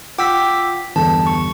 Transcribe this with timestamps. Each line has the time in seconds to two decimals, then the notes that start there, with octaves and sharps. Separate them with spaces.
0.18 F4 F#5 G5 D6 E6 B6
0.96 E2 G2 D3 A5
1.27 C#6